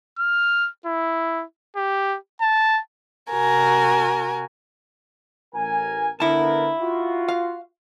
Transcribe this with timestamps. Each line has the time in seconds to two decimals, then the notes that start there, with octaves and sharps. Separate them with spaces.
0.19 F6
0.86 E4
1.76 G4
2.41 A5
3.29 C3 F#4 A#4 G#5
5.54 A1 A#4 G#5
6.20 D3 B3 E4 A#4 A5
6.79 F4 F#4
7.29 F5